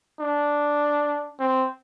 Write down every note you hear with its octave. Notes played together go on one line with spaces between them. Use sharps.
D4
C4